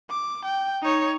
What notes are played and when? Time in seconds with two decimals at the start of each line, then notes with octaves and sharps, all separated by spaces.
0.10 D6
0.45 G5
0.82 D#4 C#5